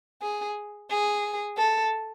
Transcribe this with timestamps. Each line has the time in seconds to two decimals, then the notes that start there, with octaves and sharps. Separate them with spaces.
0.22 G#4
0.91 G#4
1.57 A4